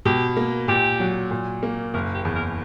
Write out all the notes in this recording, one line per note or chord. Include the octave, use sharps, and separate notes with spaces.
B2 G4
A#3
A#2 G4
F#3
A#2
A#3
F#1 A#4
G4
E2
A#4